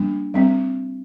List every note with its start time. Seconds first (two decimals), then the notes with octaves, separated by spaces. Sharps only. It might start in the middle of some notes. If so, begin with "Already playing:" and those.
Already playing: G3 A#3 D4
0.34 G3 C4